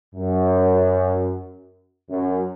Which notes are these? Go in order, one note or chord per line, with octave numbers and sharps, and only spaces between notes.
F#2
F#2